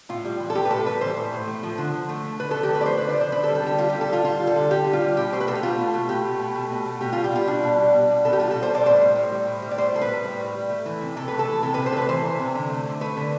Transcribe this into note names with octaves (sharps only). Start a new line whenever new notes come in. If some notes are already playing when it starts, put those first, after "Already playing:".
A2 F4
G3
E3
A4
A2 G4
B4
A2 A4
G3 B4
E3 C5
A2
A2
A3
F3
D3
D3
A3
F3
D3 B4
D3 A4
G4
A3 B4
D5
F3 C5
D3 B4
D5
D3 C5
D3 B4
A4
G3
A4
D3 G4
G3 F4
D3 G4
A4
G3 F4
D3 F4
G3
A4
D3
G3 G4
D3
F4
G3
B2 G4
A3 C5
B4
B2 A4
G4
A3 F4
B2
A3
B2 G4
A3
B2
A3
B2
A3
B2 G4
G3 F4
G4
B2 F4
G3 D4
B2
G3
B2
G3
B2 A4
G4
G3 F4
B2 A4
C5
G3 D5
A2 C5
G3
A2
G3
A2
G3
D5
A2 C5
G3 A4
B4
A2
G3
A2
G3
A3
E3
C3
C3 A4
A3 B4
A4
E3
C3 A4
C3 B4
C5
A3 A4 B4
E3 C5
C3
C3
D3
A3
D3
A3 B4
D3